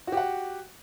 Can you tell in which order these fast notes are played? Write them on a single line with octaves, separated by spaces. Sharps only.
F#4 G4 F#5